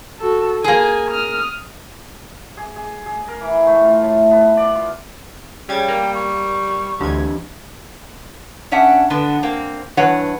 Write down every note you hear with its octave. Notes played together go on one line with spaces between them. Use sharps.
F#4 A4
A#3 G#4 G#5
D#6 F6
G#4
G#4
G#4
A#4
E3
A3
F4
A2
B3
D5
F4
C#3 G3 G5 G#6 A6
A#3
C#6
D2 E3 D4 G4 G#6
C#4 D4 E5 F#5
D3 B3 D4
A#3 C4
G2 E3 D4 B4 C#5 F#5